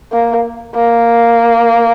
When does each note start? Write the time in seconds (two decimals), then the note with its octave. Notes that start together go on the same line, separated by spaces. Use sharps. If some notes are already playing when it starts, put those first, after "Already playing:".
0.12 A#3
0.75 A#3